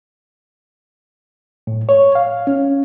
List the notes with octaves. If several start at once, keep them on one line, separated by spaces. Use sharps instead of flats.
A2
C#5
F5
C#4